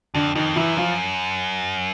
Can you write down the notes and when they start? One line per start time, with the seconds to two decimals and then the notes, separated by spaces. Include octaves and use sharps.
0.14 F2 D3 D4
0.35 F2 D#3 D#4
0.56 F#2 E3 E4
0.77 F3 F4